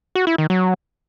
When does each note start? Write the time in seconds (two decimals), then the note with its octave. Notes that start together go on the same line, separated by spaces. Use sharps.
0.15 F#4
0.27 E4
0.38 D#3
0.50 F#3